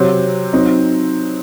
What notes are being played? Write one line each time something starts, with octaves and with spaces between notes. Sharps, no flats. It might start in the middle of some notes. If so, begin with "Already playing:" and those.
Already playing: C3 F#3 C4
F#3 C4 D#4